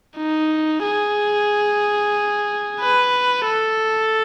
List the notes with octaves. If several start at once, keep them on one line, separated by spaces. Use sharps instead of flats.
D#4
G#4
B4
A4